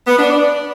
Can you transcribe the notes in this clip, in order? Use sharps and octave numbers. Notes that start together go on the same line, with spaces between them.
B3
D4
D5